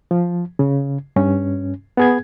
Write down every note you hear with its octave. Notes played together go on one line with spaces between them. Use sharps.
F3
C#3
G2 C#4
B3 G#4 G#6